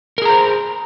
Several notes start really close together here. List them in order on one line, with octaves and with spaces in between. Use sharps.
A#4 G#4 A#5 C5